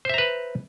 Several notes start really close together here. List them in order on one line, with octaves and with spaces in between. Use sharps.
C5 E5 A#5 B4